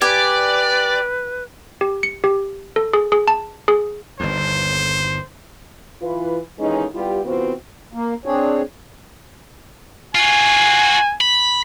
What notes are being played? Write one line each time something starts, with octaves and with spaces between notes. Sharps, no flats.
G4 B4 D5 G#5
G4
C#7
G4
A4
G#4
G#4
A5
G#4
G1 D#2 C5
E3 F4 B4
D#2 E3 G#3 C#4 D#4
G3 B3 E4 F4 G4
C3 E3 B3 C4 F4 F#4
A#3
C4 D4 G#4 C#5
F4 F#4 G#5
B5